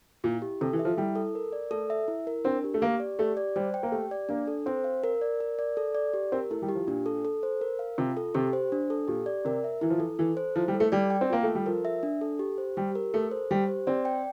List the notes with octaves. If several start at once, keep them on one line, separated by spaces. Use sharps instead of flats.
A#2 E4
G4
C3 A4
E3
E5
F3
G3 E4
A4
A#4
D5
A3 A4
E5
E4
A#4
C4 D4
G4
A3
A#3 G4
D5
A3 G4
D5
G3 C5
G5
A#3
A3 G4
D5
A#3 D4
A4
C4 C5
F5
A#4
D5
A#4
D5
A4
D5
G4
C4 A#4
A3 E4
G3
G4
F3
A#2 D4
A4
A4
C5
A#4
F5
C3 F4
A4
C3 G4
C5
D4
A4
A#2 G4
D5
C3 A#4
E5
E3 E4
F3
E3 A4
E3 A4
C5
F3 E4
G3
A4
A3
G3 D5
G5
C4
A#3 F4
A3 A4
G3
F3 A#4
E5
D4
A4
G4
C5
G3 G4
A#4
A3 A4
C5
G3 G4
C5
C4 D5
G5